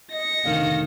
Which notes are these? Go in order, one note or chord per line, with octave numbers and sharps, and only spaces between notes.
D#5 A#6 C#7
F1 A2 D3 D#3 F5